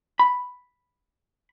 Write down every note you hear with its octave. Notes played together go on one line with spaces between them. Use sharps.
B5